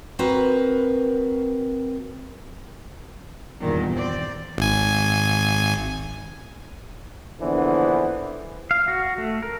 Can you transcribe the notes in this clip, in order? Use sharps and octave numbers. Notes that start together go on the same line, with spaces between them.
C4 F#4 A#4 B4
E2 G2 A#2 D#3
C4 D5
G#1 G#5
A#1 D3 E3 B3 C5
F5
F#4
A3
A#4